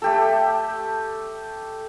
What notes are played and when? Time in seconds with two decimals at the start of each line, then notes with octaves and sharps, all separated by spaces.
0.02 A3 G4 A4